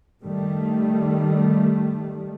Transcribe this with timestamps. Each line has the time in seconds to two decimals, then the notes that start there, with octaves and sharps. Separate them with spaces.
0.24 D#3 G3 A3